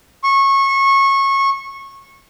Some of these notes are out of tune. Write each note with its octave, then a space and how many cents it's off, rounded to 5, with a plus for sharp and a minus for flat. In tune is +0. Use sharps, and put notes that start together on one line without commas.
C#6 -25